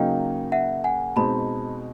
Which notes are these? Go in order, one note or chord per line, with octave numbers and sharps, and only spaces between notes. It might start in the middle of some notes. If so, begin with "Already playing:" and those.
Already playing: C#3 F#3 A#3 D#4 F5 G5
E5 F#5
F#5 G#5
B2 G#3 C4 D#4 A5 B5